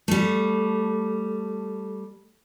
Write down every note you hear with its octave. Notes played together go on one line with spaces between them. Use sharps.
G3 A3